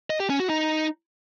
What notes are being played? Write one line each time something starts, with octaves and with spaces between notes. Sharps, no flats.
D#5
G4
C#4
F#4
D#4